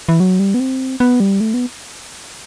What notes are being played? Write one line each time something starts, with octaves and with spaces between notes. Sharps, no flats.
E3
F#3
G3
B3
C4
B3
G3
A3
B3